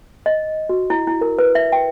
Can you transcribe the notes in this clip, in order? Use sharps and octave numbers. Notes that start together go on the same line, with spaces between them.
D#5
F#4
E4
E4
A#4
B4
E5
G5